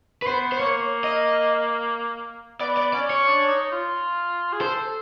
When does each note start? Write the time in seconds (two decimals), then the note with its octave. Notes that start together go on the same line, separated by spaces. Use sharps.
0.22 B4
0.26 B3 C5
0.52 C5
0.60 A#3 C#5
1.04 D#5
2.60 B3 D5
2.77 D5
2.93 C#4 D5
3.10 C#5
3.27 D4
3.49 D#4
3.72 F4
4.53 G#4
4.60 A4 C5